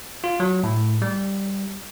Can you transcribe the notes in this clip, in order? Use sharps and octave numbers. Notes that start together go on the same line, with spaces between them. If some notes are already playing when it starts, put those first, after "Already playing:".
F4
F#3
A2
G3